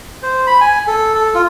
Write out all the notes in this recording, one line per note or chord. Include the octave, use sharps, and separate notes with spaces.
C5
B5
G#5
A4
A4
F4